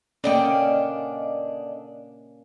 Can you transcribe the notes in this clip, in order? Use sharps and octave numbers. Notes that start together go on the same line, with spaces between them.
D3 A#3 C#4 D4 D5 D#5 G5